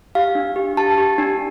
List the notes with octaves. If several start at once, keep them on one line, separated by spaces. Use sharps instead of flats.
G4 F5
D4
G4
G4 A5
G4
D4